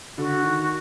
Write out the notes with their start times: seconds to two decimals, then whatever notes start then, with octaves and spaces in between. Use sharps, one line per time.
0.18 D3 F#4
0.43 D#3